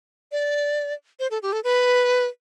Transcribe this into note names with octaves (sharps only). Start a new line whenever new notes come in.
D5
C5
A4
G4
A4
B4